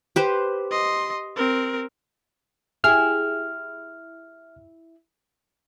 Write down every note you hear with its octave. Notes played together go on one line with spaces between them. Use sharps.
G4 B4 C5
D#5 C6
C4 A#4
E4 G4 G#4 F6